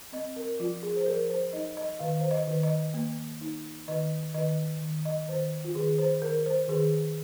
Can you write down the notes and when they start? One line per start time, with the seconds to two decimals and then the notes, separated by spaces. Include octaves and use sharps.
0.12 C4 D#5
0.36 A#4
0.60 F3 F4
0.83 G#4
0.96 C5
1.06 F3 A#4
1.30 C5
1.53 D#4 D#5
1.77 D#5
2.00 D#3 F5
2.20 C5
2.31 D#5
2.47 D#3
2.63 D#5
2.94 A#3
3.41 D#4
3.88 D#3 D#5
4.34 D#3 D#5
4.81 D#3
5.05 D#5
5.28 D#3 C5
5.64 F4
5.75 D#3 G#4
5.98 C5
6.22 D#3 A#4
6.46 C5
6.68 D#3 G#4